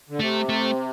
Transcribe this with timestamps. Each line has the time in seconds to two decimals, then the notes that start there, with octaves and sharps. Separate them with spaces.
0.09 D3
0.20 C3 A3
0.49 A3